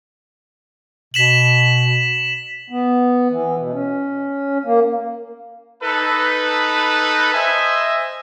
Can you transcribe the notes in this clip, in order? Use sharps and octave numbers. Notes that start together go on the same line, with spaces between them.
B2 B6 E7 F#7
B3
E3
B2
C#4
A#3
D#4 A4 B4
C5 D#5 E5 G#5